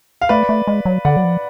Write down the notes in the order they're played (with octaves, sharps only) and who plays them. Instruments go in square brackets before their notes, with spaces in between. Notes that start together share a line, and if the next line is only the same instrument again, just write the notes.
[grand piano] F5
[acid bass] A3 [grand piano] B4 D5
[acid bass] A3
G#3
F#3
[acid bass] D3 [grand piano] D5 F#5
[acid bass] F#3
F3